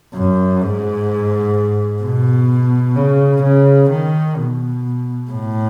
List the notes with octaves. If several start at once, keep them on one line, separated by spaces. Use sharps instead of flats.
F#2
G#2
B2
C#3
C#3
D#3
B2
A2